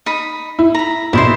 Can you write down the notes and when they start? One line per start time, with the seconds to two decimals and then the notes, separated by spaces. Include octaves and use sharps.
0.06 D#4 B5
0.59 E4
0.74 A#5 B5
1.13 A#1 B2 E4 C5 C6